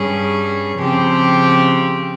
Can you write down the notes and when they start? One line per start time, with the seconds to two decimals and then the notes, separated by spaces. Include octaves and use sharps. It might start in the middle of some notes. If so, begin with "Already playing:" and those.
Already playing: G2 G3 C#4 G#4
0.77 C#3 F3 C4 G4